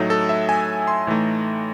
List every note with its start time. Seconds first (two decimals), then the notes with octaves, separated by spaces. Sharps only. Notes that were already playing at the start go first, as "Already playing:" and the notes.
Already playing: A2 F#3 A3 D#4
0.10 A4
0.29 E5
0.49 G#5
0.87 C6
1.07 A2 E3 A3 D#4